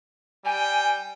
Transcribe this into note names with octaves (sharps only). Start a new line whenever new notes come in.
G3 G5 G#5